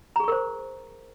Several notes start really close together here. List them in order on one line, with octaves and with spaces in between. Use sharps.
A#5 G#4 C#6 A#4 C5